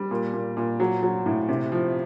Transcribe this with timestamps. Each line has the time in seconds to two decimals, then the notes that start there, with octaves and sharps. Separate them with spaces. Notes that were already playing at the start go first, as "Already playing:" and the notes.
Already playing: G3
0.11 A#2
0.33 A#2
0.57 A#2
0.80 F#3
1.03 F#3
1.26 A2
1.48 C3
1.72 F3